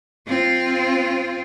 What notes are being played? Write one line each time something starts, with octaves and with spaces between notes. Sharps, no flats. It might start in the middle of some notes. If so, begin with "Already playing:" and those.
C4 F4